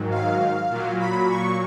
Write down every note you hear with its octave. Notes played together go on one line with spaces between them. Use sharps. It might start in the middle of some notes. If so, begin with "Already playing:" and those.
Already playing: G#2 D#3 F#3
F5
A#2 F#3
B5
C#6